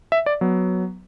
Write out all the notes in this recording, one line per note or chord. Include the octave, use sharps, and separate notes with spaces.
E5
D5
F#3 B3